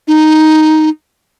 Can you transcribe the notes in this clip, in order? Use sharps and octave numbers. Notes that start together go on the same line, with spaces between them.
D#4